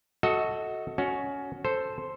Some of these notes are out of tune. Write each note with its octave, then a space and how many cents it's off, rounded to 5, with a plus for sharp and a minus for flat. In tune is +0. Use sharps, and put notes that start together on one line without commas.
F#4 +0 A4 +0 D#5 +30
C#4 +15 F#4 +0
A4 +0 C5 +0